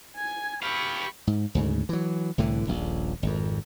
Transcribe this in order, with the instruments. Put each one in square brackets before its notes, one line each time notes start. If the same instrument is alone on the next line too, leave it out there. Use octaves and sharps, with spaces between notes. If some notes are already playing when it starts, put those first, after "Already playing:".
[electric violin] G#5 G#6
[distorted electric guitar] G4 F5 [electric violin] B5 C#6
[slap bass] G#2
D2 G#2 C#3
E3 F#3
C2 A2 D3 E3
D#1 A#1
G#1 F2